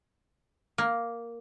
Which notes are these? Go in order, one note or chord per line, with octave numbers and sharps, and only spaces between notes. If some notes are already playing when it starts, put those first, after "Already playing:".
A#3